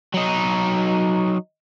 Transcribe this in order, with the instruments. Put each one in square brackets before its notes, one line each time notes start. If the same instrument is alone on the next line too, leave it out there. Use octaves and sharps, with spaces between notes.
[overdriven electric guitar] F#3 D#4